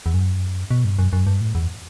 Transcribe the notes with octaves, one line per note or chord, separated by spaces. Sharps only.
E2
F#2
B2
G2
F#2
F#2
G2
A2
E2